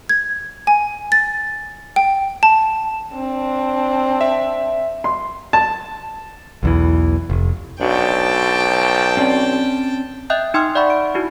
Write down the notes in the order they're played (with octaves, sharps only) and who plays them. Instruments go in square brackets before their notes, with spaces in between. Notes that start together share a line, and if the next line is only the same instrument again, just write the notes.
[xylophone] G#6
G#5
A6
G5
A5
[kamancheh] C4 D4
[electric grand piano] E5
[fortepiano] C6
A5
[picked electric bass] B1 E2 E3
F1
[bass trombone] B1 [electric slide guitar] D4 F#4 [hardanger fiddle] G5 A5
[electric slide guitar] C4 C#4 D5
[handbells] D#5 E5 G5 D#6 F#6 G6
D#4 G5 C6 D#6 F6
D5 E5 F#5 B5 C#6
D7
D#4 E4 F#4